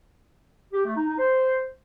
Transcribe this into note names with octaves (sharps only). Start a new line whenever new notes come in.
G4
A3
D#4
D#4
C5